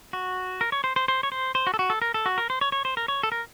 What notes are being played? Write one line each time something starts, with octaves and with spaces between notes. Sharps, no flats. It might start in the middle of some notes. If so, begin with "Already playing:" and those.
F#4
A#4
C#5
C5
C5
C5
C#5
C5
C5
F#4
A4
F#4
A4
A#4
A4
F#4
A#4
C5
C#5
C#5
C5
A#4
C#5
A4
A#4